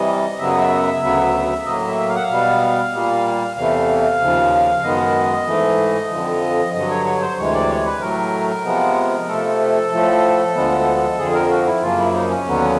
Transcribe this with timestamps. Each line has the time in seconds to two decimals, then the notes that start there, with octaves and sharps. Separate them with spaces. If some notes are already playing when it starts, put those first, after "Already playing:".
Already playing: C3 E3 G3 D#5
0.39 F#2 C#3 F#3 B3 E5
0.48 D#5
0.58 E5
1.03 D2 C#3 F#3 B3
1.66 A2 F#3 A#3 D#5
1.87 E5
2.09 F5
2.16 F#5
2.23 F5
2.30 B2 G3 B3
2.93 A#2 G3 A#3
3.56 E2 C3 E3 A3 F5
4.20 D#2 C#3 F3
4.83 F#2 D#3 G#3 B3 D#5
5.47 G#2 E3 A3
6.11 F2 D3 F3
6.74 G2 D3 F#3 D#5
6.90 C#5
7.05 C#5
7.22 C5
7.37 D2 C3 E3 G#3 C#5
7.54 D5
7.69 C#5
7.85 B4
8.01 A2 F#3 A3 A#4
8.64 C3 F3 G#3 B3
9.28 C3 F3 A3 A4
9.92 A2 F3 A3
10.55 D2 D3 F3 G#3 B3
11.18 F2 D3 F3 G#4
11.34 A#4
11.50 F#4
11.66 E4
11.82 F#2 C#3 F3 A#3 F4
11.98 E4
12.13 D#4
12.29 C#4
12.46 D#2 D3 F#3 B3